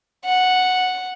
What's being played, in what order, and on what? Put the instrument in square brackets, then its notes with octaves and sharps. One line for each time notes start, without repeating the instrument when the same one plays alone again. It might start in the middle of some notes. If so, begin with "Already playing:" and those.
[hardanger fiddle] F#5